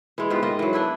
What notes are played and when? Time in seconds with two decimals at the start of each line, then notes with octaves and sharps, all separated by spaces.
0.18 E3 G#3
0.30 G#2 B3 F4 G4
0.43 D#3 F4 C5 D#5
0.59 E3 F#3
0.73 B3 D4 E4 B4